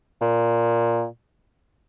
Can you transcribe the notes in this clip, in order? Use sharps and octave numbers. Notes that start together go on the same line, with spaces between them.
A#2